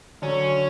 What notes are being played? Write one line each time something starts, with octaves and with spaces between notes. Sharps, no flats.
D3 F#3 C#4